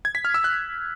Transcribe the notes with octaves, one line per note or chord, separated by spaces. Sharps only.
G#6
B6
F6
E6
F#6